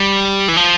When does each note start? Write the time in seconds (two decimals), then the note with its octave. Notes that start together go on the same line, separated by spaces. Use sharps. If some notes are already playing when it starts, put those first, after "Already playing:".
Already playing: G3
0.48 E3
0.57 F3